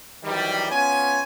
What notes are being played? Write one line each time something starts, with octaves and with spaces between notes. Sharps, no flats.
D#3 E3 F#3 G3
B3 C#4 F4 C#5 G#5